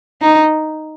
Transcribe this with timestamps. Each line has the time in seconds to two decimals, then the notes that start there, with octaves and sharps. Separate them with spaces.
0.22 D#4